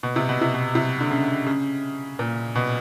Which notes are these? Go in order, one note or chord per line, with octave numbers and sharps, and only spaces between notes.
B2
C3
B2
C3
B2
C3
D3
C#3
C#3
A#2
B2